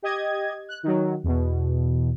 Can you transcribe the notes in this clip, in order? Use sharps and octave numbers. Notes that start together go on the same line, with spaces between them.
G4 D#5 G#6
F#6
D#3 F#3
E2 B2